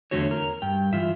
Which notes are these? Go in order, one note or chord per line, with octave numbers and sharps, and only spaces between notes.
E2 D3 A3 F#4 C#5
A#4
G2 G5
E3 F4 E5